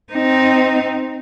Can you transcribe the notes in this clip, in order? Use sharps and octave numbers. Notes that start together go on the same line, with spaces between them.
C4 D#4